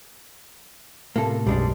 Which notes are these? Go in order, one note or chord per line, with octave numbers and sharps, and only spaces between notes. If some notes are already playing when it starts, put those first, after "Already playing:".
A2 C3 A#3 A4
B1 F#2 G3 G#3 D4